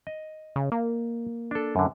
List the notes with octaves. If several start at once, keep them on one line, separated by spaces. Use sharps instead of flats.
D#5
C#3
A#3
D4 A4
F#2 D3